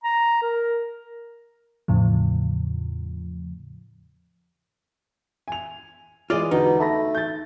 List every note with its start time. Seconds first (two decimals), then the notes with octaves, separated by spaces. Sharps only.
0.04 A#5
0.42 A#4
1.88 E2 A2 C#3 F3
5.48 G#5 F7
6.30 E3 G#3 F4 D5 D#5 D6
6.51 E2 B2 D3 D#4
6.79 A3 A5 B5 A#6
7.15 G6 A6